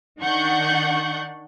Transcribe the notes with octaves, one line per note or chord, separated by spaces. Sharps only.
D#3 D4 F#5 C#6 G6